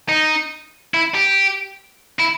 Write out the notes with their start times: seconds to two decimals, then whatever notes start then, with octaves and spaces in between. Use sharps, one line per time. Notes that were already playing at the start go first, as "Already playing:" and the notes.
0.09 D#4
0.94 E4
1.14 G4
2.20 E4